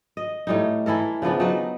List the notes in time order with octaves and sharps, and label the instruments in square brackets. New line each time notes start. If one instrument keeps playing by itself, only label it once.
[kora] D#5
A2 G3 D#4
E3 E4 A4 A#4
C#3 F3 B3 D4
F#3 D#4 B4